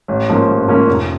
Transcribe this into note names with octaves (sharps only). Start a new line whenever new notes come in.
A1
G#2 F3 A#3 C#4
A1
G#2 F3 A#3 C#4
F1